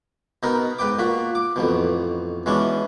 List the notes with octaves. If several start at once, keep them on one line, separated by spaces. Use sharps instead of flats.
B2 B3 D#4 A#4
G#2 B4 G5 D6
A#2 F#4 B5
D6
A1 F2 B2
B2 E3 G#3 C#4 D4